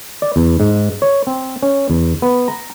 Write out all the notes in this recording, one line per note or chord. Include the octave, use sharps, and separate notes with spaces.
D5
E2
G#2
C#5
C4
C#4
E2
B3
A#5